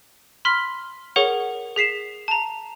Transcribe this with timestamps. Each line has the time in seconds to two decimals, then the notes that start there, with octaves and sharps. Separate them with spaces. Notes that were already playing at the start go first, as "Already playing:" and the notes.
0.45 B5 C6 F6 B6
1.16 G#4 A#4 C#5 F#5 C#6
1.76 G#4 B6 C7 E7
2.28 A5 A#5